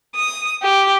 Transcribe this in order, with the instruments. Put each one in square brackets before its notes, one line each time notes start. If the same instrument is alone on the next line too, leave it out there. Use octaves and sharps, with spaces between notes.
[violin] D#6
G4